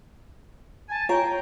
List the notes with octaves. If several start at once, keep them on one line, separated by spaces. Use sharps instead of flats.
G#5 A5
F4 C#5 G5 A#5